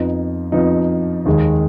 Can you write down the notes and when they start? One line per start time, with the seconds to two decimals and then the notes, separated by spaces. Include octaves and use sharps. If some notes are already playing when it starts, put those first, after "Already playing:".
Already playing: F2 F3 B3 D#4
0.52 F2 F3 B3 D#4
1.26 D#2 D#3 G#3